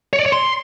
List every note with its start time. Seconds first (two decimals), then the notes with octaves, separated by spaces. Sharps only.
0.13 C#5
0.19 D5
0.26 C#5
0.32 C6